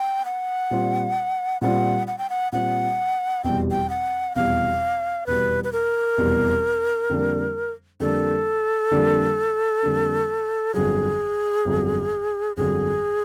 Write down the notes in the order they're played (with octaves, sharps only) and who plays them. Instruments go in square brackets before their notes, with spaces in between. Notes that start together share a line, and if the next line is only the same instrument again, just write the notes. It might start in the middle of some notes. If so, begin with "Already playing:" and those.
Already playing: [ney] G5
F#5
[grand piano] A#2 G3 C4 F4
[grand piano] A#2 G3 C4 F4 [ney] F#5
[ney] F#5
G5
F#5
[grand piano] A#2 G3 C4 F4 [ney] F#5
[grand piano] F1 E2 B2 G3 [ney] G5
[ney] G5
F#5
[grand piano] F1 E2 B2 G3 [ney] F5
[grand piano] F1 E2 B2 G3 [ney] B4
[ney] B4
A#4
[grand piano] F1 E2 B2 G3
F2 D3 G3 A#3 D4
[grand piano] F2 D3 G3 A#3 D4 [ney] A4
[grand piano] F2 D3 G3 A#3 D4
F2 D3 G3 A#3 D4
[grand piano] G1 F2 D3 F#3 [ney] G#4
[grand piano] G1 F2 D3 F#3
[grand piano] G1 F2 D3 F#3 [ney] G#4